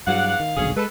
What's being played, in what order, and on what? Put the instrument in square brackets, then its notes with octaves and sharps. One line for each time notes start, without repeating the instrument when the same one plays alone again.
[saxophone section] E2 D5 F#5 [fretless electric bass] G2 F#3 [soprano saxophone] F5
[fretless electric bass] D#3
[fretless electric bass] D#1 B1 D3 [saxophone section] C#4 G#4
[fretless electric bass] G#3 [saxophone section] A4 B4